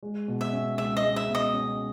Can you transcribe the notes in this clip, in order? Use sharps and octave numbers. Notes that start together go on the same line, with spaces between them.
G#3
B2
E5
C#4
C#2 E5
D#5
G#3
E5
B2
D#5
C#4